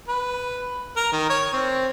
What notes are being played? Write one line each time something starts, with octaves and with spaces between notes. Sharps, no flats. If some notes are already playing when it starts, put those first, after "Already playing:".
B4
A#4
D#3
C#5
C4